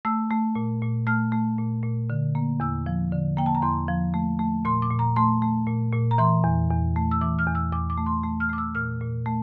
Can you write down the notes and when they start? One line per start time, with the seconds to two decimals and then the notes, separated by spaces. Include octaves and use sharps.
0.05 A3 E6
0.31 A3
0.55 A#2
0.82 A#2
1.07 A3 F6
1.32 A3
1.58 A#2
1.83 A#2
2.10 D3
2.35 A#3
2.60 E2 E6
2.86 F3
3.12 D3
3.37 A#3 G5
3.46 A5
3.55 A#5
3.62 E2 C6
3.88 F3
4.14 A3
4.39 A3
4.65 A#2 C6
4.82 D6
4.90 A#2
4.99 A#5
5.16 A3 C6
5.42 A3
5.67 A#2
5.93 A#2
6.11 A#5
6.18 E3 C6
6.44 E2
6.70 E2
6.96 A3
7.11 E6
7.21 E3 D6
7.39 F6
7.47 E2
7.55 E6
7.72 E2 D6
7.90 D6
7.98 A3
8.06 C6
8.23 A3
8.40 F6
8.49 A3 D6
8.58 E6
8.75 A#2 F6
9.01 A#2
9.26 A3